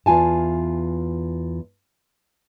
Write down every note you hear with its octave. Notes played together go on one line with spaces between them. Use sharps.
E2 F4 G#5 A5